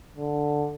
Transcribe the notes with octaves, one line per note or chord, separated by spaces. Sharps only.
D3